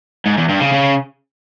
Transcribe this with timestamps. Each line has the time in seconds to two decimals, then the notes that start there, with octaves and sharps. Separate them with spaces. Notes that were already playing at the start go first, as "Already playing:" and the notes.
0.26 G#2
0.37 E2
0.49 G2
0.61 C#3
0.72 C#3